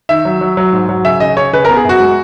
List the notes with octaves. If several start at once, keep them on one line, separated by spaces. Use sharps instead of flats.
D#3 E5
F#3
F#3
F#3
G#2
F#3
C#3 E5
C#3 D#5
C#3 C#5
C#3 B4
A#4
B3
G#4
F#2 F#4
G#3